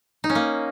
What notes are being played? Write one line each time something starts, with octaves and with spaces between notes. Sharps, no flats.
D#4
C#4
A#3